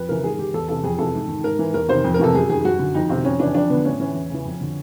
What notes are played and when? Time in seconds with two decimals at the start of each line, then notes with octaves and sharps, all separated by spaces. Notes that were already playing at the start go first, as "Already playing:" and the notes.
Already playing: F2 B4
0.09 C#3 E3 A#4
0.24 G#2 G#4
0.39 D#3 G4
0.54 E2 A4
0.68 C3 E3 A4
0.84 F2 G#4
0.98 C3 E3 A4
1.14 G#2
1.29 D#3
1.44 G#2 A#4
1.59 E3
1.74 E2 A#4
1.89 C3 D#3 C5
2.04 F2
2.14 A#4
2.19 C3 E3 A4
2.35 F#2 G#4
2.50 D#3 G#4
2.65 F#2 F#4
2.79 D3
2.95 F2 D#4
3.09 C3 D#3 C4
3.24 F2 C#4
3.40 C#3 E3 D4
3.55 F2 D4
3.70 D3 B3
3.85 A2 C#4
4.00 E3 C#4
4.15 E2
4.30 C#3 E3
4.45 F2
4.61 D3